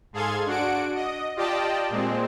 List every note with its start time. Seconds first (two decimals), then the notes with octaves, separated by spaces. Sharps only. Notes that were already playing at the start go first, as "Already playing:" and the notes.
0.13 G#2 G#4 A4 F5 C6 G#6
0.46 D4 F#4 F#5 D7
0.95 D#5
1.36 F4 G4 D5 D#5 G5 A5
1.90 A#2 G#3 C4